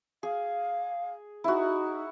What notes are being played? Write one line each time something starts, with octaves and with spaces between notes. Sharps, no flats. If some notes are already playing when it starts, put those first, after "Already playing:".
G#4 F5
D#4 E4 F#4